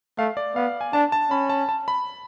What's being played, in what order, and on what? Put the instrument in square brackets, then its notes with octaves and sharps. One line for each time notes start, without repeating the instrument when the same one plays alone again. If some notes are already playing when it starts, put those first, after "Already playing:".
[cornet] A3 [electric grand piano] F5
[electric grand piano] D5
[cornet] B3 [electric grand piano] F5
[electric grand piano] G#5
[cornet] D4 [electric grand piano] A5
[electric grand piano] A5
[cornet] C#4 [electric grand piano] B5
[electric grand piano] A5
A5
B5